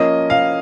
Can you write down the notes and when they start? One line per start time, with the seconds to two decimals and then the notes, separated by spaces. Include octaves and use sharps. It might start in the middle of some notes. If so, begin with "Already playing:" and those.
Already playing: F3 A#3 C#4 D#5
0.30 F5